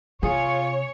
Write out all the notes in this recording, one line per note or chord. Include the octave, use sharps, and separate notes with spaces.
C3 F4 G#4 C#5